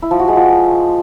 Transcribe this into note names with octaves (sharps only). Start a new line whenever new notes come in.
E4
F3
F#4
G#3
F3